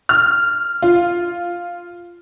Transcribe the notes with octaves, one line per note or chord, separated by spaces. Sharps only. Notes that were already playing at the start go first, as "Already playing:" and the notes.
F6
F4